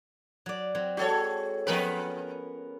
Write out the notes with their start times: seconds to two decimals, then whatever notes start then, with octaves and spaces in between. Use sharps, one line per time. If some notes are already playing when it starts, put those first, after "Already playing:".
0.46 F#3 D5
0.75 F#3 C4
0.97 G#3 F#4 A4 C#5
1.67 F3 B3 C#4 A#4 B4 G5